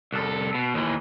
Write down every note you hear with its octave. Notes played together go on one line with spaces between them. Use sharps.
C2 A4
B2
D#2 E3